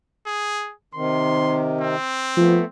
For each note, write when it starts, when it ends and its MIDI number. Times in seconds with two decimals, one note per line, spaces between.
0.26 0.72 68
0.94 1.95 48
0.94 1.95 51
0.94 1.64 84
1.81 2.68 60
2.37 2.59 53
2.37 2.65 57
2.37 2.65 59